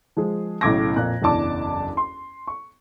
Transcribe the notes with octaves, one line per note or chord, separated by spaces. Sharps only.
F3 G#3 G#4
B1 A2 C#3 D6 G#6 A#6
F2 A#2 F#6
F#1 B1 E2 D4 A5 D6
C6
C#6